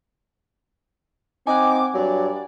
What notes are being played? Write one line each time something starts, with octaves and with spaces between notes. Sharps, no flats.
C4 D#4 F#5 G#5 D6
G2 F#3 D5